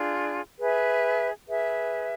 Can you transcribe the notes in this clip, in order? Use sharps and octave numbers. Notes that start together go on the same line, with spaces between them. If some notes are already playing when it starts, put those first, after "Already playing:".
Already playing: D4 F4 G#4
G#4 B4 E5
G#4 B4 E5